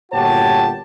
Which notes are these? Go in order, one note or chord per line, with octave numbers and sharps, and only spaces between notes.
G1 A#2 F#4 G4 C#5 A5